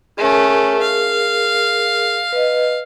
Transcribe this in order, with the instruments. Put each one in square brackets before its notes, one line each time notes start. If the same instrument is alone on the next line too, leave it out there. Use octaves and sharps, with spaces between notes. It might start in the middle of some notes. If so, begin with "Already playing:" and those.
[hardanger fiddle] A3 C#4 [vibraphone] G#4 A#4
[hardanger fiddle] F5
[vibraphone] B4 D#5